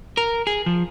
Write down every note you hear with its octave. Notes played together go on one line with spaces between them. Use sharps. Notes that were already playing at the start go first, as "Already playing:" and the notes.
A#4
G#4
F3